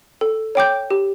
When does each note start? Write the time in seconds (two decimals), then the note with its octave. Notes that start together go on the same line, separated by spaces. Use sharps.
0.21 A4
0.55 C#5 G5 D6 G6
0.90 G4